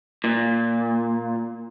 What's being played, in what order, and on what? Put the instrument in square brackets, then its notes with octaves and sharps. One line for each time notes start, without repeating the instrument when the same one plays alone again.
[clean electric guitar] A#2